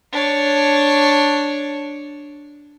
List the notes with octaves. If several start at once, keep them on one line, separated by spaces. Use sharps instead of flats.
D4 C#5